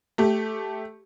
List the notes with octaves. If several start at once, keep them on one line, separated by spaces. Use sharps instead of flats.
A3 G4